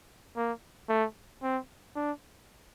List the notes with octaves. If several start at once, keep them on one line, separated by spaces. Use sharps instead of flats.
A#3
A3
C4
D4